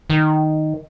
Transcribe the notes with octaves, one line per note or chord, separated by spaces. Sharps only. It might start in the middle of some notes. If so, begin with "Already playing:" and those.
D#3